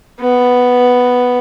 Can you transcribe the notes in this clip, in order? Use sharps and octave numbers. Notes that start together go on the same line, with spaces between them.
B3